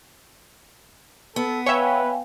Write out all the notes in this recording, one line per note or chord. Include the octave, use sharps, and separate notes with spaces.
B3 A4
B4 C#5 E5 F5 G5 G#5